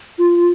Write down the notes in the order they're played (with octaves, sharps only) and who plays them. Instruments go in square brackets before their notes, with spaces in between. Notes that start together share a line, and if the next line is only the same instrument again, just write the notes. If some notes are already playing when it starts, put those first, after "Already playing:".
[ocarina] F4